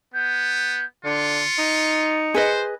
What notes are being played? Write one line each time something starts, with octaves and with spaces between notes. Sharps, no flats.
B3 G6
D3 F4 C#7
D#4
G#4 B4 C5 D#5